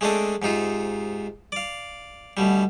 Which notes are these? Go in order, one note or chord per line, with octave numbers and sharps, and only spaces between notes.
G#3 A3 C4 D4 A4 D#5
G#2 C3 D#4 F4
D5 F5
D2 B2 G3